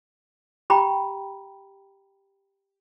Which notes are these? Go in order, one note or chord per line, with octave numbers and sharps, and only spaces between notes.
G4 G5 A#5 B5